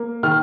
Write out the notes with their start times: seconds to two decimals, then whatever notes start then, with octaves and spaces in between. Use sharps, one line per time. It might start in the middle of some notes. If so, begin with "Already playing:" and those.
Already playing: A#3
0.23 D#3 F6